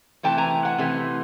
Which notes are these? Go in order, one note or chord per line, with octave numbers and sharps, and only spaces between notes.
C3 E3 A3 G5 A5
G#5 A#5
F#5 G#5
C3 E3 A3